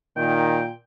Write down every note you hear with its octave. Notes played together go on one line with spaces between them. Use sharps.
A#2 D#3 G5